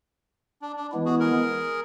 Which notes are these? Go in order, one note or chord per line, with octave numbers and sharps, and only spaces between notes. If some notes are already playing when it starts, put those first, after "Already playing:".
D4
D4
E3 G#3 B3 E4
F#4 G#4
G#4 A#4